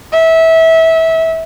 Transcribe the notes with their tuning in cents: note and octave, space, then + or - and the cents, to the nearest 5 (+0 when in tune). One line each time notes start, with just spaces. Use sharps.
E5 -20